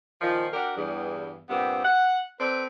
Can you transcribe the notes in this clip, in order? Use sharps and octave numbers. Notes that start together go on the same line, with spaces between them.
A#2 D#3 F3
D4 F#4 G4 A#4
E2 G2
G2 A#2 B3 C4
F#5
C4 A4 B4 D5